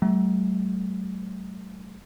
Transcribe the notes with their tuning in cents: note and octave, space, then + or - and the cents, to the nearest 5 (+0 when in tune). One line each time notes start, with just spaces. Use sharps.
F#3 +35 A3 -25